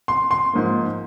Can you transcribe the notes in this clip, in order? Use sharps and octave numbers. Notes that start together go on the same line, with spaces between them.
C6
C6
G#2 F3 A#3